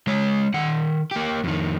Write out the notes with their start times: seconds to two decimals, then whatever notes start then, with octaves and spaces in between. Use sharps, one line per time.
0.07 G#3 C#5
0.54 D#3 F#5
1.11 A#3 G4
1.44 F2 D#3